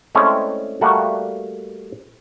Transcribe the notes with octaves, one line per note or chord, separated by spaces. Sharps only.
G#3 A3 C4 C#4 E4 D5
G3 A3 A#3 F#4 F#5